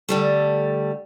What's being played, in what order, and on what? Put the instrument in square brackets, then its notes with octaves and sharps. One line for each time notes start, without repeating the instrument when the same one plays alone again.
[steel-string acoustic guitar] D3 G3 A3